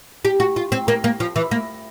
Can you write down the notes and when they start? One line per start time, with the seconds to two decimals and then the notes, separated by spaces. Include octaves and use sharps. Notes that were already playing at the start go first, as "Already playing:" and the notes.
0.25 G4
0.40 F#4
0.56 F4
0.72 C4
0.88 A#3
1.04 A#3
1.20 F3
1.36 E3
1.51 A#3